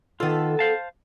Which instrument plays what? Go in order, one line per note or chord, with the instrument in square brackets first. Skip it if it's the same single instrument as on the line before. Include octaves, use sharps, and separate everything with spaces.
[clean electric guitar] D#3 F4 [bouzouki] B3 A4
[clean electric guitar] C5 F5 A5